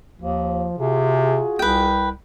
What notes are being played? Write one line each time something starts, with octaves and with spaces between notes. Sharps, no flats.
D#2 F3
C3 F4 F#4 G#4
C2 B4 G5